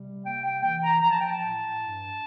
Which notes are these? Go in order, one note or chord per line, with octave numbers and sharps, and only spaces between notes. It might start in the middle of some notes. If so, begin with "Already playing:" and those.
Already playing: C3 G3
A#3 G5
G5
E3 G5
A#5
F3 A#5
A5
G5
A5
A2
G2